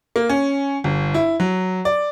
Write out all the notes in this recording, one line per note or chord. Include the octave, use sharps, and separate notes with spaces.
A#3
C#4
G1
E4
F#3
D5